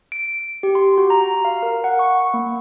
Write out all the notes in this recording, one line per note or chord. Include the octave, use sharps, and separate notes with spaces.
D7
G4
C6
F#4
A#5
F5
A#4
F#5
C#6
A#3